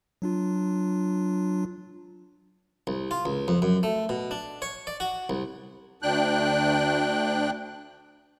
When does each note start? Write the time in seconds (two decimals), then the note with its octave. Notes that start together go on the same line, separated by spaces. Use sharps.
0.22 F#3 D4 F4
2.87 C2
3.11 F4
3.25 C#2
3.48 F2
3.62 F#2
3.83 A3
4.09 B2
4.31 D4
4.62 C#5
4.87 D5
5.00 F#4
5.30 C2
6.02 D2 D4 G5 F#6